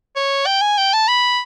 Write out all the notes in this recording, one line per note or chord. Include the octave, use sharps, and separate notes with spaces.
C#5
G5
G#5
G5
A5
B5